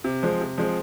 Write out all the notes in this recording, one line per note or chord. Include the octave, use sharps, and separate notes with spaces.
C3
F3 G#3 C4
C3
F3 G#3 C4